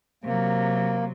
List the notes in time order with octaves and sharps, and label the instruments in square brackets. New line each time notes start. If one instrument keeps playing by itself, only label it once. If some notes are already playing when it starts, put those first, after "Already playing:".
[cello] C3 F#3 [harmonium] A#3